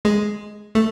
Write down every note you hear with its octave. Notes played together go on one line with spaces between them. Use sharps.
G#3
A3